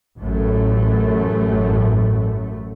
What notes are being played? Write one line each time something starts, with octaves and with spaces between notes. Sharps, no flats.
A1 F#2 A3